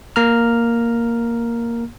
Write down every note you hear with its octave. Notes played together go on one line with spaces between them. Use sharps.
A#3 A#5 F6